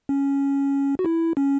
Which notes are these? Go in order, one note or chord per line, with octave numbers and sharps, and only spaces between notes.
C#4
F#4
E4
C#4